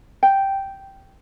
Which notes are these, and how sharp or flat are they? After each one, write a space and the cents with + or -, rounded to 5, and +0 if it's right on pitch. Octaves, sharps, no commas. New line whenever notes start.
G5 -5